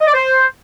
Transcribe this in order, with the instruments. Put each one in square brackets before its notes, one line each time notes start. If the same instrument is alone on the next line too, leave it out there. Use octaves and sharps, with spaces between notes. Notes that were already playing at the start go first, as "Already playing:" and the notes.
[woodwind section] D#5
D5
C5